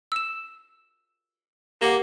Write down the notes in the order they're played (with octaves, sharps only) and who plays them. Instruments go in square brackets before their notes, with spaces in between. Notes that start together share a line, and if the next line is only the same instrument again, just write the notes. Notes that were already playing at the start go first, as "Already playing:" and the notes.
[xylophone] E6 E7
[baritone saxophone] A#3 [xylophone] G4 F#5